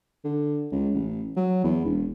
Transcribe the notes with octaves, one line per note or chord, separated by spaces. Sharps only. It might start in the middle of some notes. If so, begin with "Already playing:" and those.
D3
C#2
A1
F#3
E2
E1